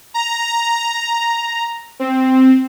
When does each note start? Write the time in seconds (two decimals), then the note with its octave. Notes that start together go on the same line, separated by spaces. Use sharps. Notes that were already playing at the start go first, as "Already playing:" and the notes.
0.14 A#5
2.00 C4